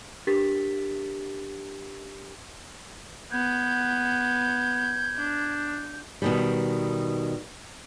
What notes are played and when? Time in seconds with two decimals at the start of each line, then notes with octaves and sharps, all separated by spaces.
0.27 D4 G4 A#4 A6 B6
3.31 B3 G6 G#6
5.17 D4
6.22 B2 D#3 G3